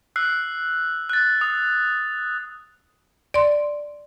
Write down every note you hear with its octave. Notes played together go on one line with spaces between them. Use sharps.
E6 F#6 C7
F#6 A6
D#6
D5 C6